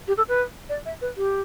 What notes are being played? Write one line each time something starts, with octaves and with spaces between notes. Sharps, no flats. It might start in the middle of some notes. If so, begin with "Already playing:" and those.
G4
A4
B4
D5
E5
B4
G4